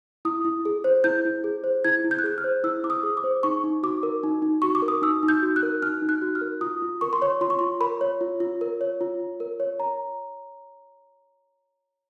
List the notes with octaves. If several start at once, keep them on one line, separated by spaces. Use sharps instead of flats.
E4 D#6
E4
G#4
C5
E4 G6
E4
G#4
C5
E4 G#6
E4
G6
F#6
G#4 G6
F6
C5
E4 E6
E4 D6
D#6
G#4
D6
C5
D#4 C#6
D#4
F#4 D6
A#4
D#4
D#4
F#4 C#6
D6
A#4
D#6
D#4 E6
D#4
G6
F#4
F#6
A#4
D#4 F6
D#4
F#6
F#4
F6
A#4
F4 D#6
F4
A#4 C#6
C6
C#5 C#6
F4 C6
C#6
F4 C6
A#4 B5
C#5
F4
F4
A#4
C#5
F4
F4
A#4
C#5
A#5